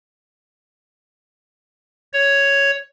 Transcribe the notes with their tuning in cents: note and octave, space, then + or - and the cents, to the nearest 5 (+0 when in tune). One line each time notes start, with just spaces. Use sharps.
C#5 +5